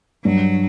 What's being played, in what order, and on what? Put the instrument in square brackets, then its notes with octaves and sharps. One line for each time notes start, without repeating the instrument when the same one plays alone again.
[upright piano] G2 [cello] F#3